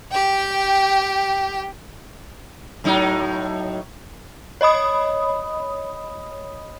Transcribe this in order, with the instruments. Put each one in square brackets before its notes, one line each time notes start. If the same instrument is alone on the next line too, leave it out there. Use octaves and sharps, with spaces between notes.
[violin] G4 G5
[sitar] A2 F#3 D#4
[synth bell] C#5 D#5 B5 D#6